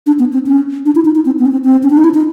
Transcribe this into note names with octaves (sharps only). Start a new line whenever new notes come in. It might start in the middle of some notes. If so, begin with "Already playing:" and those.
D4
B3
C4
C#4
D4
E4
D#4
D#4
C4
B3
C#4
C4
C4
C#4
D4
D#4
E4
D#4